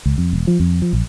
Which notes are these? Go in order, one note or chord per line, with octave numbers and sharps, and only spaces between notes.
C#2
F2
E1
F3
F2
F3
A#1